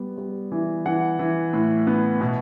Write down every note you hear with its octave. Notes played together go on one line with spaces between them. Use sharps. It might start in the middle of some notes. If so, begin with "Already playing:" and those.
Already playing: G3 B3
G3
E3
E3 F#5
E3
A2
B3
B2